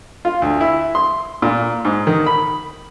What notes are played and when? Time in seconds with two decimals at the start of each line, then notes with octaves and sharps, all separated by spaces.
0.25 F4
0.42 D2
0.61 E4
0.95 C6
1.42 A#2
1.85 G#2
2.07 D#3
2.27 B5